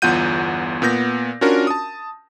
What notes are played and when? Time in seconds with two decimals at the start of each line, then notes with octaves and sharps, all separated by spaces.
0.02 G1 E2 F4 F#5 G6 D#7
0.82 A#2 B3 G6 A#6
1.41 C#4 D4 F4 F#4 A#4
1.67 A5 D#6